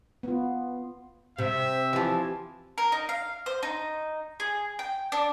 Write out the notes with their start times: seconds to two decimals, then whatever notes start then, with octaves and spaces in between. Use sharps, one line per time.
0.23 B3 F4
1.38 C3 C5 E5
1.93 E3 F3 G4
2.78 A#4
2.92 D#4
3.09 F5
3.46 C5
3.63 D#4
4.40 G#4
4.79 G5
5.12 D4